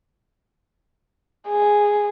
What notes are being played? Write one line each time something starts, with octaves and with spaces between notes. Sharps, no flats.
G#4